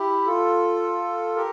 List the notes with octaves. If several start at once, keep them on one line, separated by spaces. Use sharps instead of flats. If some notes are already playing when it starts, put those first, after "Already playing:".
Already playing: E4 G4
F4 A4
G4 A#4